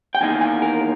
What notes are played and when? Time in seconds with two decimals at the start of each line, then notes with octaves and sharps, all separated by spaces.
0.15 G5
0.21 E2 D#3 A#3 G#5
0.41 G#5
0.62 A#4